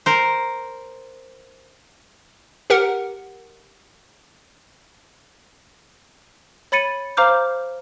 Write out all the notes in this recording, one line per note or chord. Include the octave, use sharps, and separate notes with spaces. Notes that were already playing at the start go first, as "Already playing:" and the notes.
A#4 C5
G4 A#4 F#5
C#5 B5 A6 C#7 D#7
C5 F5 A#5 D6 F6 G6